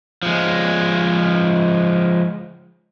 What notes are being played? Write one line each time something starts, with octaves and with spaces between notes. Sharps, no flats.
F3 G#3